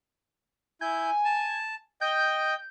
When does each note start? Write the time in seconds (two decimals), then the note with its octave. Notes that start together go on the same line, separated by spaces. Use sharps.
0.81 E4 G#5 G6
1.25 A5
2.01 D#5 G5 G6